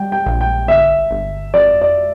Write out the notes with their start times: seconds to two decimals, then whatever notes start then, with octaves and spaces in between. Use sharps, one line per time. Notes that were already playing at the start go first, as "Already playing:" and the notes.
Already playing: G3 G5
0.12 G5
0.26 A#1
0.41 G5
0.68 G1 E5
1.11 G1
1.54 F2 D5
1.82 D5